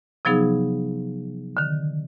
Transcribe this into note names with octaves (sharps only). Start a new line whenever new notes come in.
C3 F3 F#3 B3 D#4 G#4
D3 D#3